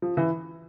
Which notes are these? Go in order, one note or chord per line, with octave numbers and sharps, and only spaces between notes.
F3
E3